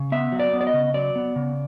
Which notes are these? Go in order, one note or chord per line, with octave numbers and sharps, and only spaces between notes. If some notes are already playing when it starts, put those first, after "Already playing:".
Already playing: C#3
B3 E5
F#3
D5
B3
D5
D#5
C#3
F#3 D5
B3
C#3